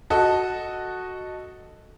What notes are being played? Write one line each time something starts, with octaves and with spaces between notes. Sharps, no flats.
F#4 A4 D#5